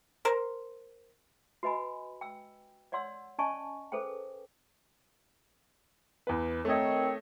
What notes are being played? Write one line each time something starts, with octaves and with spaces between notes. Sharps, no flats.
A#4 C5
F#4 B4 D#5 G#5 B5
G5 E6
C#5 D5 F#5 C6 E6
C#4 D5 D#5 G#5 A5 C#6
G#4 A4 B4 C5 G5
E2 B4
D#3 A3 C4 C#5 D#5